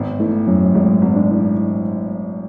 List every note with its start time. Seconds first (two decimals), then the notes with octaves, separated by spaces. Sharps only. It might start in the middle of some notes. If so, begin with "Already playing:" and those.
Already playing: G#1 B3
0.20 E3 A3
0.47 F#2 F#3
0.75 G#1 G#3
1.02 G#1
1.16 D4
1.31 E3